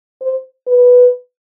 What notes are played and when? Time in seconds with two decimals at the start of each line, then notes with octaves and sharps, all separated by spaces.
0.22 C5
0.67 B4